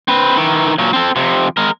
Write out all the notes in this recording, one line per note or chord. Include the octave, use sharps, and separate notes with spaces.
C4 B4
D#3 E3
A#2 F#3
C4 A4
F2 C3
G#3 A#4